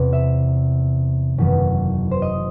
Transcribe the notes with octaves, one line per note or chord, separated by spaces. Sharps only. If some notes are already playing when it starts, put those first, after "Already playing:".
Already playing: E2 C3 E3 B3
E5
F#1 E2 D#3 F#3 B3
C5
D#5